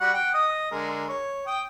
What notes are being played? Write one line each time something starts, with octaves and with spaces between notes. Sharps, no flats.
G3 F#4 F#5
F#5 G5
D#5 D#6
D3 G#3 A#4
C#5
G5 D#6